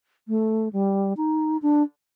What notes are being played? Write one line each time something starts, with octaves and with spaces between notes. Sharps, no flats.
A3
G3
D#4
D4